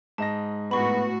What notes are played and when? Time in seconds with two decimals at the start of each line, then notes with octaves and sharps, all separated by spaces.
0.18 G#2 D#5 A5 A#6
0.71 A2 B3 F#4 B5 C#6